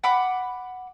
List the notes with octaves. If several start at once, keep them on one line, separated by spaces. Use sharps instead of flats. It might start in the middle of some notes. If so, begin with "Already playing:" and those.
F#5 B5 D6